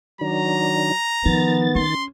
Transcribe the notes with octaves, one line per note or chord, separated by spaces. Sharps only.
D#3 F#3 D4 A#5
D#3 F3 B3 A6
C#4 C6